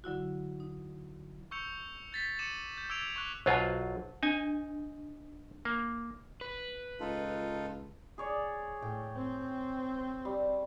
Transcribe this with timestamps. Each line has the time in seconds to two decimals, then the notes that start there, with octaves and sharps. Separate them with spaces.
0.04 D3 F#3 E4 F#4
0.60 D#4
1.51 C#6 E6 G6 C#7 F7
2.13 G6 A6 B6
2.39 D6 C#7 D#7 E7 F#7
2.77 G6
2.89 D6 E6 G#6 A6 D7 F7
3.16 C#6 D6 F#6
3.46 B1 F#3 F4 C5 F#5 A5
4.23 D4 D#4 G#5
5.65 A#3
6.41 B4
7.00 C#2 D#4 F4 A4
8.18 G#4 C#5 D5
8.82 A2 G5
9.16 C4
10.25 G3